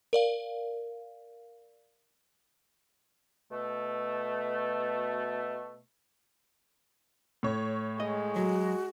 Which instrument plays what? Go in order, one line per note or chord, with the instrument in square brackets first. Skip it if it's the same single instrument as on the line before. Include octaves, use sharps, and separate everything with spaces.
[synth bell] A#4 D5 F5
[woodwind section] B2 A3
[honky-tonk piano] A2 C#5
[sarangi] G#3 [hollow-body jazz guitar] D#5
[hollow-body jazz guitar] F#3 [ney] F#4